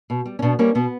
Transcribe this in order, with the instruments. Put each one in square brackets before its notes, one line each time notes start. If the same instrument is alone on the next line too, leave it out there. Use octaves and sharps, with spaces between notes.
[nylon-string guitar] B2
G3
C#4
B2 B3 D4
G3 A#3 C#4
B2 B3